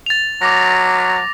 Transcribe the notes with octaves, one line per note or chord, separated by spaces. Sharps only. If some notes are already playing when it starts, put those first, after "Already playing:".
A6 F7
F#3 D6 A#6